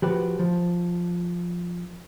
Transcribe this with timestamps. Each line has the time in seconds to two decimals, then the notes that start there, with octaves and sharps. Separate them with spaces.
0.02 F3 F#4 G4 B4
0.39 F3